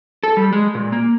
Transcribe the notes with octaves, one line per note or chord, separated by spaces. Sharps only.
A4
G3
G#3
A#2
A#3